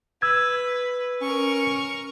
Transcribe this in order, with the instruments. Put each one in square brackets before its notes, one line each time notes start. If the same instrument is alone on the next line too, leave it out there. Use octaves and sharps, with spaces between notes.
[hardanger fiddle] B4 [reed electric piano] E6 G#6
[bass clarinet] C#4 [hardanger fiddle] A#4 C#6